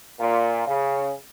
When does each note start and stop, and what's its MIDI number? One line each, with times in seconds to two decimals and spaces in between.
0.19 0.61 46
0.66 1.11 49